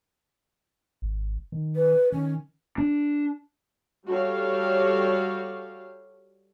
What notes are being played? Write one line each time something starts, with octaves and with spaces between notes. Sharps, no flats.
G#1
D#3
B4
D#3 C#4
D4
G3 F#4 G4 A4 C#5 F5